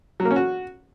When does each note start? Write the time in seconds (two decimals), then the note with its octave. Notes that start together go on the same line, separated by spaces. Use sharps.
0.20 F#3
0.25 A#3
0.31 C#4
0.36 F#4